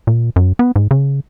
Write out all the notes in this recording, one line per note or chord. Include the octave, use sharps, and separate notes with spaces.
A#2
F#2
B3
G#2
C#3